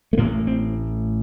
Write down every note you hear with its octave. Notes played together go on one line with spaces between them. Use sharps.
A3
A1 A2 A#3
C4